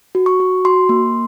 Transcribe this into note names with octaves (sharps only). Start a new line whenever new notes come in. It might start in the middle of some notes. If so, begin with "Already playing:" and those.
F#4
C#6
F#4
F#4 C6
A#3